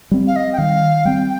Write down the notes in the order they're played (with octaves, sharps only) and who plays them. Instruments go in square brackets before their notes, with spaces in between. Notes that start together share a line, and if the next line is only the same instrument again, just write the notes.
[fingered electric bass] G3 C4
[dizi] F5
D#5
G5
[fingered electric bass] D#3 [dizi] F5
[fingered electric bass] G3 C4 [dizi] G5